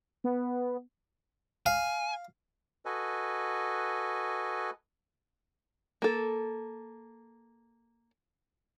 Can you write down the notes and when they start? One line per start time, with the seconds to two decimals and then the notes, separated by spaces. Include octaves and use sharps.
0.24 B3
1.66 F5 G#5
2.85 F#4 A4 B4 D#5 G#5
6.02 A#3 A4